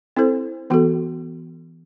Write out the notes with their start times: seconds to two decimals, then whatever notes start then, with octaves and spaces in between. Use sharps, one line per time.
0.17 C4 E4 A4 C5
0.70 E3 B3 F#4 A4